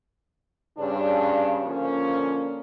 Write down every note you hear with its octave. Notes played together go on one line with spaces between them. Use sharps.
G2 C#3 D4
D3 F3 A#3 C#4